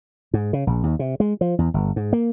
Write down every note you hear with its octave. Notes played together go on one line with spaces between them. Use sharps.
G#2
C#3
A#1
D#2
C3
G#3
F3
E2
G1
G#2
A#3